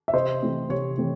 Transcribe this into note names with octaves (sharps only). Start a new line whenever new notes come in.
E5
C3 C5 D#5
E3 A3 C4
C3 C#5
E3 A3 C4